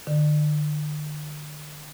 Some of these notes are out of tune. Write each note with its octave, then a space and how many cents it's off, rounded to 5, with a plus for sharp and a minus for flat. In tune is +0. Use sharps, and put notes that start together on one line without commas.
D3 +35